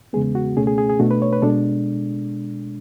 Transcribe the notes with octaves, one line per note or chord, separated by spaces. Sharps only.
E2 C#3 G#3 B3 G#4
F#4
C#2 B2 A3 C#4 G#4
G#4
G#4
G#4
B2 A3 D4 F#4
B4
C#5
B4
B2 G#3 D4 A4